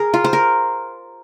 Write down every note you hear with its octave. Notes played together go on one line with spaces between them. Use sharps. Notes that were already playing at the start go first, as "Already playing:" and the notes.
Already playing: G#4 A#4
F4
C5
A#4